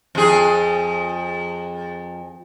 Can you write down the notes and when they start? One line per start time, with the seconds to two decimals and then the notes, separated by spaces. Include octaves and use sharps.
0.15 F2 G#4